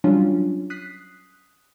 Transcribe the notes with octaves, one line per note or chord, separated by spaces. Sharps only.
F#3 G3 C#4 D4 F4
D#6 F#6 B6 C7